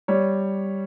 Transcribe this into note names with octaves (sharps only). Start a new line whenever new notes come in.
G3 C#5